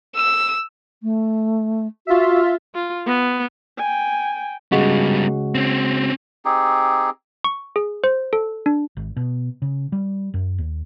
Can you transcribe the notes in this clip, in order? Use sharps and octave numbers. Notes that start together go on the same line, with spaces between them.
E6
A3
F4 F#4 E5
F4
B3
G5 G#5
C#3 G3 G#3 B3 F#4
C4 C#4
C4 D#4 G4 G#4
C#6
G#4
C5
A4
D4
G#1
B2
C#3
G3
F#2
D#2